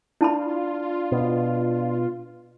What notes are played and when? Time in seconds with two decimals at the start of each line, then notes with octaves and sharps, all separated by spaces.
0.21 D4 E4 F4 A5 B5
1.12 B2